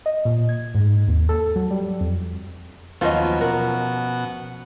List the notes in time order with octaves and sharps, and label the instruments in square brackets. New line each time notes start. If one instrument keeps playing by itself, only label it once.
[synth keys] D#5
A#2
G#6
G#2
D#2
A4
F#3
G3
F2
[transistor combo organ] D#2 F#3 B3 [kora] F3 C#4 [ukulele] F4 D#5
[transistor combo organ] B2 F#5 [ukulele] A#4